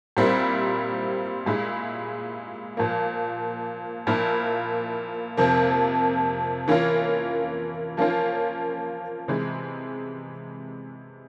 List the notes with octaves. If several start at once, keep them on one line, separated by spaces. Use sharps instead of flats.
A#2 G3 C4 E4 A#4
A#2 G#3 E4
A#2 F3 A#3
A#2 F3 A#3 E4 A#4
F2 C3 F3 A#3
E3 A#3 C#4 F4
F3 A#3 C#4 F4
C3 E3 G#3